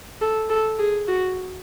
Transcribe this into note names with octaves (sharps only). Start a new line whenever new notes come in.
A4
A4
G#4
F#4